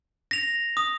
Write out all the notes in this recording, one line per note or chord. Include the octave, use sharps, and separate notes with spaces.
A#6 F7
D#6